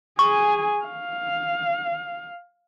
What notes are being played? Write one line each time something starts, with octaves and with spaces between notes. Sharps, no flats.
G#4 G#5 C#6
F5